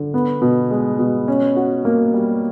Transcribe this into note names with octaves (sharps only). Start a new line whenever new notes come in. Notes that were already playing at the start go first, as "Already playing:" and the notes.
Already playing: D3
B3
B2
G#3
B2
C#4
F#4
A#3
G3